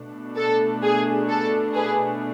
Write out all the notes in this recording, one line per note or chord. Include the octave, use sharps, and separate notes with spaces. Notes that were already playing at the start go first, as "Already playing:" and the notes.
Already playing: B2 A3 D4
A4
G#4
A4
G#4 B4